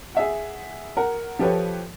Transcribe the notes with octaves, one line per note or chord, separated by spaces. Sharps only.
G#4 E5 F#5
A#4 F#5
F3 G4 A4 B4 C#5